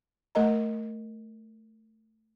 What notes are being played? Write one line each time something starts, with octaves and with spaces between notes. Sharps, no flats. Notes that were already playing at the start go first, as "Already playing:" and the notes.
A3 A#4 D#5 A#5